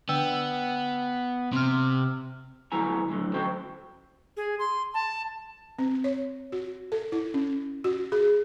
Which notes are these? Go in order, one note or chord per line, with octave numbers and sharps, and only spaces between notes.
D3 B3 G5 E6
C3 C4 F6
D2 F#3 B3 E4 G#5 A#5
A2 D3 F#3
C#4 F#4 C5 G5
G#4
C6
A5
C4
C#5
F#4
A4
E4
C#4
F#4
G#4